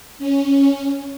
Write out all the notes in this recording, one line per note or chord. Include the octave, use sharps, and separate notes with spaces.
C#4